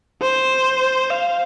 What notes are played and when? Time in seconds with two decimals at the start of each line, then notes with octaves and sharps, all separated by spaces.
0.22 C5
1.10 F5